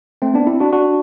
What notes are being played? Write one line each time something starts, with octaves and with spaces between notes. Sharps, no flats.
A3 C4
B3 D4
C4 E4
D4 F#4
D4 F#4